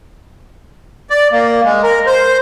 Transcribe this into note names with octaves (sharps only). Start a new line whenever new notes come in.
D5
A#3
G#3
A#4
C5